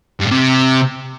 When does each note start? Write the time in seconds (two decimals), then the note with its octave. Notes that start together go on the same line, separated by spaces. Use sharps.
0.20 G2
0.25 A2
0.31 C3